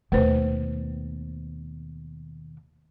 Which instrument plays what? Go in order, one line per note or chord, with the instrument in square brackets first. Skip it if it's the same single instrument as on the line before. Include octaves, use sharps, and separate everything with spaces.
[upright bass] D#2 B2 [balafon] A3 B4 C5